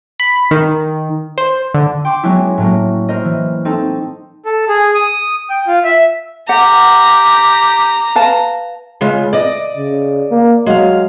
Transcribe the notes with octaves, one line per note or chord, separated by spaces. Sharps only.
B5
D#3
C5
D3
G5 C6 D6
F#3 G#3 B3 C#4 E4
A2 F#3 A#3
A#4 C5 D#5
E3
C4 D#4 A4
A4
G#4
D#6
G5
F4
E5
G4 F#5 A#5
B4 F5 A5
C#3 G#3 F4
D5 D#5
C#3
A#3
F#3 G#3 F5